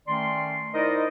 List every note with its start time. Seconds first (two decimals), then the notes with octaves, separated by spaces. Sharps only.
0.07 D#3 A3 C#4 D5 C6
0.74 D#4 E4 A#4 C5 D5 D#5